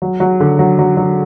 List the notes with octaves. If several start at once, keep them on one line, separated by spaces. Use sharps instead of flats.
F#3
F#3
D3
F#3
F#3
F#3